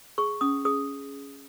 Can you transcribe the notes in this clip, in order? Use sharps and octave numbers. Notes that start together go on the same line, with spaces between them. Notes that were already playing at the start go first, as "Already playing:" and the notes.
G#4 C#6
C#4 D#6
G#4 D#6